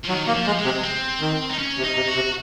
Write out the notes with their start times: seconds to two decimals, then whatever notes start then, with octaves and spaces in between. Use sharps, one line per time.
0.04 F3
0.08 D#3 F#3
0.25 F#3 A#3
0.34 F3
0.46 G#3
0.59 G#3
0.64 C3
0.84 C4
1.21 D#3
1.50 D#4
1.59 C#4
1.78 C3
1.84 D#4
1.96 C3
2.08 F#4
2.15 C3